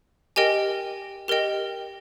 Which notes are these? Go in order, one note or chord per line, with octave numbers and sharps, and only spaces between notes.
G4 A#4 D#5 G5 G#5
G4 A#4 D#5 G5